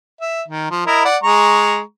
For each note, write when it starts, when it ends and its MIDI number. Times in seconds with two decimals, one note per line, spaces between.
0.21 0.42 76
0.48 0.68 51
0.71 0.83 53
0.86 1.03 64
0.86 1.03 70
0.86 1.03 75
1.05 1.17 74
1.05 1.17 78
1.24 1.79 56
1.24 1.79 82
1.24 1.79 85